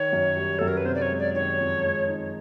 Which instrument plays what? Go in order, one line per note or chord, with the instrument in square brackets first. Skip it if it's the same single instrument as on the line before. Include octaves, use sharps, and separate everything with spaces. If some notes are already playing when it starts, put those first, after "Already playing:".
Already playing: [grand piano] D#3 [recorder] C#5
[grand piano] F#2
G3
[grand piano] F#2 [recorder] A4
[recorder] A#4
B4
[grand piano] C3 [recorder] C5
[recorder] D5
C#5
[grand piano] G#3
[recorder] D5
[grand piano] D#3 [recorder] C#5
[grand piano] F2
G#3
D#4